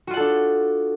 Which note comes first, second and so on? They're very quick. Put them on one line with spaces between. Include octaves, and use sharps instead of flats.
F#4 F4 F#5 A4 D4